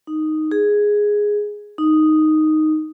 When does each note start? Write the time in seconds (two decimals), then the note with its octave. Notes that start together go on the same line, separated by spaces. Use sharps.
0.07 D#4
0.51 G#4
1.78 D#4